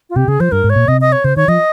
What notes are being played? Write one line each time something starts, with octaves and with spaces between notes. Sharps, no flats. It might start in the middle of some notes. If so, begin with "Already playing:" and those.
F4
C3 G4
C#3 G#4
F3 C5
G2 A#4
G#2
C#5
A#2
C3 D#5
D#5
C#5
C#3 C5
D#3 C#5
F3 D#5